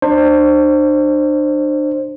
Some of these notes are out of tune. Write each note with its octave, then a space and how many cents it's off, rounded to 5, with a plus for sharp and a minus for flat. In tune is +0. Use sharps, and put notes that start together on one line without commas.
D4 +35 C5 +15